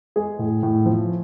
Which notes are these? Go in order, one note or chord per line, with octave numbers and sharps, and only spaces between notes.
G#3 G#4
A2
A2
F3